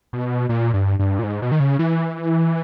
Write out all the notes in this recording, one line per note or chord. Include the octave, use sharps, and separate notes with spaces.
B2
A#2
G2
G2
A#2
G#2
B2
D#3
C#3
E3